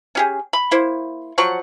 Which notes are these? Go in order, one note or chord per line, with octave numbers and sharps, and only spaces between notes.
C#4 G4 G#4
B5
A#3 E4 C5
F3 F#3 F#5 C#6